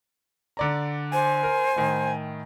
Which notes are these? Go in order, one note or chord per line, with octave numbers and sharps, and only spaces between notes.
D3 D5 A#5
C5 G#5
A#4
A2 D#3